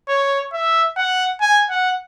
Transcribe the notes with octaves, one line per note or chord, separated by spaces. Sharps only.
C#5
E5
F#5
G#5
F#5